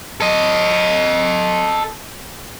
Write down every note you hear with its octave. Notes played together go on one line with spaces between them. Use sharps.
A4 D#5